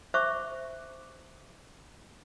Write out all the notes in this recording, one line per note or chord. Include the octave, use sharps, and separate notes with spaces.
C5 E5 C#6 D6